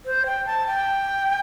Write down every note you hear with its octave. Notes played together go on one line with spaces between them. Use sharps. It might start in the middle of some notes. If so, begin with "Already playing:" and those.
C5
G5
A5
G5